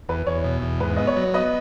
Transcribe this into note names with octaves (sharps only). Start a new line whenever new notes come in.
E2 B4
E2 C#5
B2
E2
G#2 B4
B3 D#5
C#5
F#3
B3 B4 D#5